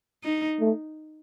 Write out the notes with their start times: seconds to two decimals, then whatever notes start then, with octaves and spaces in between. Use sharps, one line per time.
0.24 D#4
0.60 A3